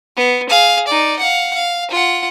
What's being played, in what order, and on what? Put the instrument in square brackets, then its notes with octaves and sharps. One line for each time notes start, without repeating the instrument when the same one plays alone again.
[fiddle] B3
G#4 F5
D#4 D5
F5 F#5
F5
F4 F#5